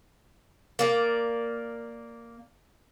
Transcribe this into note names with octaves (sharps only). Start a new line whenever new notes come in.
A#3 D5